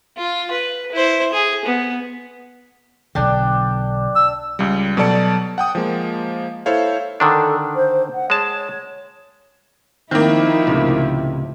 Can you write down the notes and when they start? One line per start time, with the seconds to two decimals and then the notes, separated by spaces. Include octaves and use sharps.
0.17 F4
0.51 B4
0.92 E4 C5
1.33 G#4
1.65 B3
3.15 B1 D3 D4 G5
4.15 E6
4.59 C#2 G3
4.97 B2 F#3 A4 D5 A5 C#7
5.58 F#5 G5 D#6
5.75 F3 G#3 A#3
6.66 E4 A4 C5 C#5 F5
7.20 D3 D#3 D4 A4
7.75 C5
8.14 F#5
8.30 G#3 C#5 A5
10.11 D#3 F3 A#3 C4 D#4 E4
10.67 C#2 A2 C3